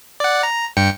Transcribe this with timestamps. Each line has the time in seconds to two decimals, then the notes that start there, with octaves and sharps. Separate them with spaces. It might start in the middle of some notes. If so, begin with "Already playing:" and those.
0.20 D5 F#5
0.43 A#5
0.77 G2 G5 C#7